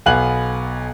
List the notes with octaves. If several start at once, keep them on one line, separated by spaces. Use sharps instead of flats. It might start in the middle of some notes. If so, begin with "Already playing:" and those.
B1 B3 F5 G#5 F#6 F#7